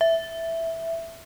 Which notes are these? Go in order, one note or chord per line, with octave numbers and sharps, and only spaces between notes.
E5